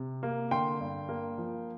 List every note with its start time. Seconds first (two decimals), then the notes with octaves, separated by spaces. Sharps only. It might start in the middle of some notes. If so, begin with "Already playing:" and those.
Already playing: C3
0.23 A#3
0.51 D3 G5 C6
0.80 G2
1.09 A#3
1.38 F3